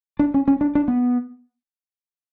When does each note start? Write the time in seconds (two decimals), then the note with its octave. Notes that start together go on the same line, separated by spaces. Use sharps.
0.19 D4
0.34 C#4
0.48 C#4
0.61 D4
0.75 D4
0.88 B3